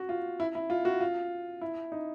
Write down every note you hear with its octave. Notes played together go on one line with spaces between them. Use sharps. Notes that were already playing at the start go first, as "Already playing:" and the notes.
Already playing: F#4
F4
E4
E4
F4
F#4
F4
E4
D#4